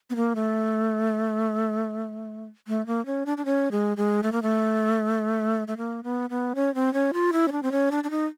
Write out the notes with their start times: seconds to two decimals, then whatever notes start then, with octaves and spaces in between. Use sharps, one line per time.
0.10 B3
0.16 A#3
0.36 A3
2.68 A3
2.87 A#3
3.06 C#4
3.26 D4
3.37 D4
3.45 C#4
3.72 G#3
3.97 G#3
4.23 A3
4.32 A#3
4.42 A3
5.68 A3
5.77 A#3
6.04 B3
6.30 B3
6.55 C#4
6.75 C4
6.94 C#4
7.13 F4
7.33 E4
7.48 C#4
7.52 D4
7.63 C4
7.72 C#4
7.91 D4
8.04 D4
8.10 D#4